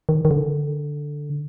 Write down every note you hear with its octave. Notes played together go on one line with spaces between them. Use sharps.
D#3
D#3
D3